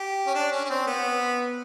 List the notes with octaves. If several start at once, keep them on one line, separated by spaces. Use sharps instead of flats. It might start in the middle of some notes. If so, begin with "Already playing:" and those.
Already playing: G4
C#4
D4
C#4
C#4
C4
B3